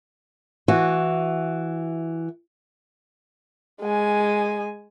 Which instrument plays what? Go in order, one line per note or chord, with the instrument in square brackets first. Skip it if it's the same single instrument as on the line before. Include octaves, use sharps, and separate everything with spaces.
[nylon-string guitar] E3 F#4
[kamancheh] G#3 G#5